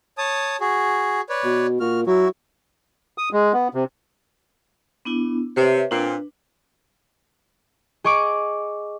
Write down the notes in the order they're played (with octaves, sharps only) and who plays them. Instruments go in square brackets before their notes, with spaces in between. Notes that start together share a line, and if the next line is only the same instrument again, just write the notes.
[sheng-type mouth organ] C#5 A5 D#6
F#4 G#4
B4 C#5 D5
[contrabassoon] B2
[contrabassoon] A#2 [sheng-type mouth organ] F#4 F6
[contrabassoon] F#3 [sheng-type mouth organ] E4 F#4
[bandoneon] D#6
G#3
B3
C3
[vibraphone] B3 D4 E4
[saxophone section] C3 [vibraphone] B4 C#5 E5
[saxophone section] A#2 C4 [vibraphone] D4 B4
[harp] G#4 D#5 C#6 D6 D7